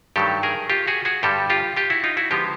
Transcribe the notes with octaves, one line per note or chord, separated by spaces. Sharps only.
G2 D#3 F#3 A3 G4 A4
G#4 A#4
F4 G4
F#4 G#4
F#4 G#4
G2 D3 G3 G4 A4
F4 G4
F4 G4
E4 F#4
D#4 F4
E4 F#4
D3 F3 G#3 B3 F4 G4